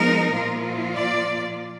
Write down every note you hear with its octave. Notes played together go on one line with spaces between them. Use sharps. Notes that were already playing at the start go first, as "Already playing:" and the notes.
Already playing: F3 G#3 B3 D#4 A#4
A#2 F3 A#3 F4
D5